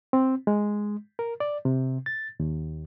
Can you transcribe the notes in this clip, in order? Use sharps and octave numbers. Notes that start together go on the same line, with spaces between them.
C4
G#3
A#4
D5
C3
A6
D#2